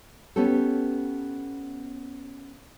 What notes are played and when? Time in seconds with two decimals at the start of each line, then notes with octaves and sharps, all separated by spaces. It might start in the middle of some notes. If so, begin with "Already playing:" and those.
0.36 B3 C#4 G4 A4